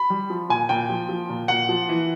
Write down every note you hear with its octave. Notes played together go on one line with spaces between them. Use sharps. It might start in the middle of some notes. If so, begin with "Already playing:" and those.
Already playing: B5
G3
F3
A#2 G#5
A#2 G5
F3
F3
A#2
A#2 F#5
F3
E3